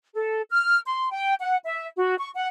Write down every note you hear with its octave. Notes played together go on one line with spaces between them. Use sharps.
A4
F6
C6
G5
F#5
E5
F#4
C#6
F#5